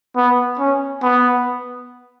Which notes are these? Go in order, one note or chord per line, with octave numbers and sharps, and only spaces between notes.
B3
C#4
B3